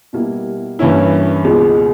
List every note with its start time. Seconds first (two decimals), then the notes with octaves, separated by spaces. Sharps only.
0.13 B2 G3 A#3 E4
0.79 G2 E3 A#3 C#4 E4
1.44 C#2 B2 G#3